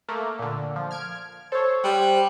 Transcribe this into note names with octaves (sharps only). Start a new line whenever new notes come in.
A3 A#3
A#2 D3
F3
F6 G#6 D7
A4 C5 C#5
G3 F#5